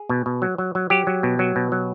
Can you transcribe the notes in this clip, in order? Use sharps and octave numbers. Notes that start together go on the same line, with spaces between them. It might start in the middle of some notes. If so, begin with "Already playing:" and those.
Already playing: G#4
B2
B2
F#3
F#3
F#3
F#3 G4
F#3
B2
F#3
B2
F#3